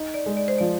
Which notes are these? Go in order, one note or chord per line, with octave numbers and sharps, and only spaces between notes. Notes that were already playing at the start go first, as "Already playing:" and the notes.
Already playing: D#4
D5
G#3
D5
C5
F3 D5